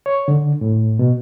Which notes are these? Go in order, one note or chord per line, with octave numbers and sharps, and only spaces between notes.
C#5
D3
A2
B2